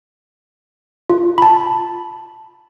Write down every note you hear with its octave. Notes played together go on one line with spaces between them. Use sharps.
F4
A5 B5